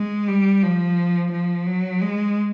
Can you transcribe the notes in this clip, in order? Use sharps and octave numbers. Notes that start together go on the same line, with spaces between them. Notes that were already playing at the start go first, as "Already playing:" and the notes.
Already playing: G#3
G3
F3
F3
F#3
G#3